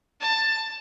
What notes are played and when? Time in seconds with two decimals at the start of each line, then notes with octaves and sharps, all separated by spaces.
0.21 A5